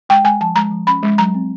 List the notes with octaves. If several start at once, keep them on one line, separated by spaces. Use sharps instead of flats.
G#3 G5
G#3 G#5
F3 A5
G#3 A#5
F3
C#4 B5
G#3
F#3 A#5
C4